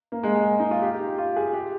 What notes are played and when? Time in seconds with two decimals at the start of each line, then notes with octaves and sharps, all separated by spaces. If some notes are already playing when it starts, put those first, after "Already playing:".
0.12 A#3
0.23 G#3
0.35 G#3
0.59 D#4
0.71 F4
0.82 G4
1.18 F4
1.36 G#4
1.54 G4